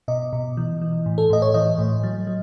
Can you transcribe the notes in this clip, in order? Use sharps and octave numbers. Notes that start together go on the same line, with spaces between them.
B2 D#5
B2
E3
E3
A2
A4
A2 D#5
C#5
E3 D#5
A2
F#3
F#3